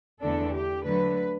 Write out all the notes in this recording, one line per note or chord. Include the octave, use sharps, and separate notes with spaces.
E2 D3 A3 D4 A4
G4
D3 F#3 A3 B4